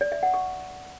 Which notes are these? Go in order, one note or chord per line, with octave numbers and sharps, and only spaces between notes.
D5
E5
F#5
C#6